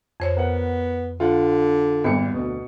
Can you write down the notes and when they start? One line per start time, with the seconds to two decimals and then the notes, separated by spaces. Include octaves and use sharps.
0.20 F2 C5 C#5
0.37 B3 A#4 F#5
1.20 D3 F4 F#5
2.04 G#1 G3 B3 C#7
2.34 D2 B2